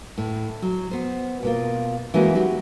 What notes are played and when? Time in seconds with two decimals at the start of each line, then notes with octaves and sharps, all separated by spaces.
0.18 A2
0.62 F#3
0.91 B3 C5
1.43 B2 A#3 F4
2.14 E3 G#3 A#3 C#4 D#4 F#4
2.35 F#3 F#4 G4